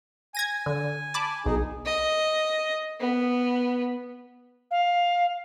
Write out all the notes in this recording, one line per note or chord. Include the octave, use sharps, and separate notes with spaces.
G#5 G#6 A#6 D#7
D3
A5 B5 D6
B1 D#4 G#4
D#5
B3
F5